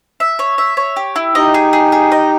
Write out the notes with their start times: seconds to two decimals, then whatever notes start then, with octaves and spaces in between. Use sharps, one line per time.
0.20 E5
0.39 C#5
0.58 E5
0.77 C#5
0.97 G4
1.16 E4
1.35 D#4 G4 D#5
1.54 G#4
1.73 G#4
1.92 G#4
2.12 D#5